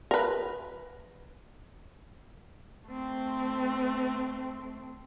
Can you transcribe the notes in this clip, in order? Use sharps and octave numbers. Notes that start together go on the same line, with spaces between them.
A#4 B4
A3 C4